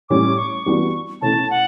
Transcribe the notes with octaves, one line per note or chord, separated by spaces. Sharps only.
A2 G3 C#4 D6
C#6
E3 G3 B3 D4 F#4
B2 A3 C#4 E4 A5
F#5